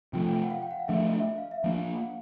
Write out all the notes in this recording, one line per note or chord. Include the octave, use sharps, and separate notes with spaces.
C3 F3 A3 G5
G5
F#5
F5
G5
F#5
F5
F3 A3 D4 E5
D#5
E5
F5
E5
F3 A#3 D4 F5
F#5
F5